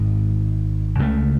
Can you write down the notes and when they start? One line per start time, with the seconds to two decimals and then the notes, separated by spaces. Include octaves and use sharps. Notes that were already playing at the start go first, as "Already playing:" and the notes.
Already playing: G#1 G#2 G#3
0.99 C#2 C#3 F#3 A3